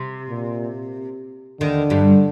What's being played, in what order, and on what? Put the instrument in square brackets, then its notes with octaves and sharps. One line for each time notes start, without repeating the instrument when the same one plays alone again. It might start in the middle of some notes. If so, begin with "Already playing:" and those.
Already playing: [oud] C3
[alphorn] A#2
[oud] D#2 D#3 [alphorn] D3
[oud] G2 G3